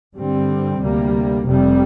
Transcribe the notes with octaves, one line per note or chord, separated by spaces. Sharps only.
G2 D3 G3 C4
D2 C3 G3 A#3
F1 F2 C3 G3